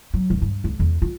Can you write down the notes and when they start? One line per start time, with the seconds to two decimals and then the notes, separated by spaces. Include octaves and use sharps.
0.14 F#3
0.30 D1
0.42 G2
0.64 C#2
0.79 E2
1.02 F4